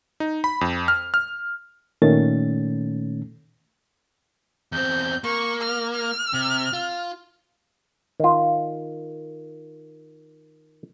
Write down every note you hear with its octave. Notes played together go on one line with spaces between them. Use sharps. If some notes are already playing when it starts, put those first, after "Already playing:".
D#4
B5
F2
F6
F6
A#2 D#3 A3 C#4 A6
E2 C4 G6
A#3 C#6
F6
F6
C3
F4
D#3 F4